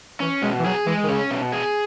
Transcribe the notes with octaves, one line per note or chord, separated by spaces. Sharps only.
E3 C#4
B2 G#3
E3
F#3 G#4
E3 G#3
D#3
C#3 C#4
B2
G#4